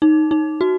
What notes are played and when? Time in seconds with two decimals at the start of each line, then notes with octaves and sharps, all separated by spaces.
0.02 D#4
0.31 D#4
0.61 F#4